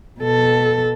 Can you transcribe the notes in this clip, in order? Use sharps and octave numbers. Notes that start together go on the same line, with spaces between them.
B2 A4